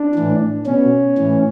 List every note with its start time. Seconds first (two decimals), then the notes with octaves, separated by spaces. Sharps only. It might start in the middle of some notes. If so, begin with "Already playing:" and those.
Already playing: D4
0.15 A2 E3
0.66 B2 C#4
1.18 A2 E3